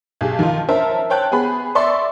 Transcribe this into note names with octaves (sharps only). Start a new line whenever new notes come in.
B1 G4 G#4
D#3 F3 F4
C#4 A#4 C5 E5 A5
C5 C#5 G5 A5 F#6
B3 G#4 B5
D5 E5 C6 C#6 E6